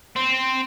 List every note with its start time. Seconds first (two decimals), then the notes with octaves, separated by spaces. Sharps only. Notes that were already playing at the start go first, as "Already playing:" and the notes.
0.16 C4